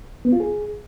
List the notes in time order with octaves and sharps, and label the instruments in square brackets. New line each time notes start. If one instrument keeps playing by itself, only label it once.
[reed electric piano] B3
F4
G#4